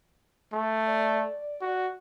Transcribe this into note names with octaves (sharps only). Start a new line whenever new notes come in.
A3
D5
F#4